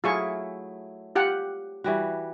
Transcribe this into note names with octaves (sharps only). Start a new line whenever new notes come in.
F#3 A3 E4 F4 G#4 C#6
F4 G4 F#5
E3 G3 F#4